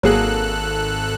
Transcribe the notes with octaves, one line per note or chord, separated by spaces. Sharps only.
G#1 F#3 A#3 G#4 A4 F#6